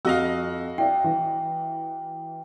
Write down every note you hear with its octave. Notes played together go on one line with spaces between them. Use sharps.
F2 F#4 D#5 F5 E6
E4 D5 E5 G5
E3